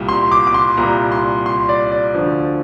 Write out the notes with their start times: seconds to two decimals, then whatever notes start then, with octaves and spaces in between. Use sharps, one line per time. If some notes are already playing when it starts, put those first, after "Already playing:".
Already playing: C2 A#2 G3
0.09 C6
0.32 D6
0.47 D6
0.54 C6
0.77 C2 A#2 G3 A#5
1.12 C6
1.46 C6
1.69 D5
1.92 D5
2.14 D2 D3 F3